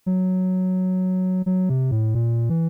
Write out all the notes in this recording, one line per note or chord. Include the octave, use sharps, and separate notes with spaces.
F#3
F#3
C3
A2
A#2
E3